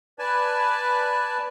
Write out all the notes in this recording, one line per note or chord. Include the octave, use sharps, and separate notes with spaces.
B4 D5 G#5 A5